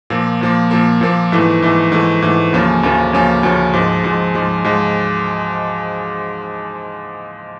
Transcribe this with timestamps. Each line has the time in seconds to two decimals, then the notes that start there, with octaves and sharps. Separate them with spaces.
0.10 A#2 F3 A#3
0.41 A#2 F3 A#3
0.71 A#2 F3 A#3
1.01 A#2 F3 A#3
1.32 G#2 E3 A3
1.62 G#2 E3 A3
1.92 G#2 E3 A3
2.22 G#2 E3 A3
2.53 D2 C#3 F3 A#3 C#4
2.83 D2 C#3 F3 A#3 C#4
3.13 D2 C#3 F3 A#3 C#4
3.43 D2 C#3 F3 A#3 C#4
3.73 G#2 F3 G#3
4.04 G#2 F3 G#3
4.35 G#2 F3 G#3
4.64 G#2 F3 G#3